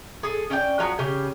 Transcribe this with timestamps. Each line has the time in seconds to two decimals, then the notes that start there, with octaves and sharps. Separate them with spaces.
0.23 G#4 A4
0.50 C#4 D5 D#5 G5
0.79 F3 F#3 F#4 G#4
0.99 C#3 C#4 G4 G#5